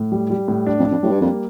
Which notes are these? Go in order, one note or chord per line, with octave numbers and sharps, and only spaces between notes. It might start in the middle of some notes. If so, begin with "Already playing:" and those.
Already playing: A2
G3
G3
A2
D4
F2
D4
F2
A2 G3
G2
F2 A#3